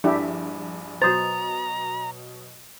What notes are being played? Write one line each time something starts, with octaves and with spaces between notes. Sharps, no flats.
A#1 G2 D4 E4 G4
B2 F#3 F#4 C5 A#5 D#6 A6